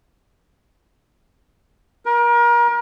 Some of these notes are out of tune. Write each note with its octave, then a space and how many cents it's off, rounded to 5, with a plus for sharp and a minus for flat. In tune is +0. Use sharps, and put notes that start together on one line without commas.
A#4 +35